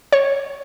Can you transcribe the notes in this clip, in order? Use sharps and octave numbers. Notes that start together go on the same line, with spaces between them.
C#5